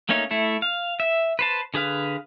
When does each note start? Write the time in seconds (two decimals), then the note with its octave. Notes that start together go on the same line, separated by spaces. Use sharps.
0.09 A3 A#3 C#4 D#4 C#5
0.31 A3 E4 A4
0.62 F5
1.00 E5
1.39 B4 C5 A5
1.74 D3 G#4 B4 F5